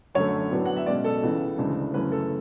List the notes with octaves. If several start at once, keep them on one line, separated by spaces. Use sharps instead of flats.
F#2 D3 A3 C#5
A2 F#3 B3 D4
F#5
E5
B2 G#3 C#4 D5
A4
C#2 C#3 E3
D2 C#3 E3 G#3 D4
F#2 C#3 E3 A3 C#4 B4
A4